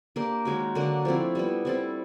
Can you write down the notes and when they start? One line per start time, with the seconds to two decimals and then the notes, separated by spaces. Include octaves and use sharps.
0.16 A#3 D4 G4
0.45 D#3 G#3 C#4 F#4
0.75 D3 F#3 A#3 D4
1.05 F3 A3 C4 E4
1.35 G3 B3 E4
1.65 G3 C4 E4 A4